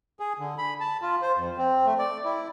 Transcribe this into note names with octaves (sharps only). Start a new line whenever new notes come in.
G#4
D3
B5
A5
F4
C5
F2
C4
A3
D5
E4